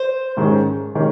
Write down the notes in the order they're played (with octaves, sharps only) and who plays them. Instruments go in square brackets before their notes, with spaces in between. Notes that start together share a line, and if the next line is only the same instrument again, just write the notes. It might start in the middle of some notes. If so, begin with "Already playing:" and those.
Already playing: [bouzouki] C5
[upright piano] G#2 D#3 G#3 C#4
D#3 G#3 C#4